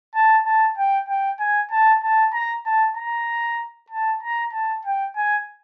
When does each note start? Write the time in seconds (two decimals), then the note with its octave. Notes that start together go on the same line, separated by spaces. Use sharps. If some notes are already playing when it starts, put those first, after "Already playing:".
0.15 A5
0.46 A5
0.78 G5
1.09 G5
1.39 G#5
1.71 A5
2.03 A5
2.33 A#5
2.66 A5
2.97 A#5
3.90 A5
4.23 A#5
4.53 A5
4.85 G5
5.16 G#5